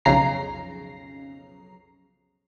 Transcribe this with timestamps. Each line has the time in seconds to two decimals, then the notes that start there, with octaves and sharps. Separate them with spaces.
0.05 B1 F2 C#3 A#5 C7